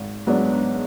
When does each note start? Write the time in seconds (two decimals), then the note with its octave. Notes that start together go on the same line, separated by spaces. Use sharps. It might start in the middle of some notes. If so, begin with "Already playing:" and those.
Already playing: G#1
0.27 G#2 F#3 B3 D4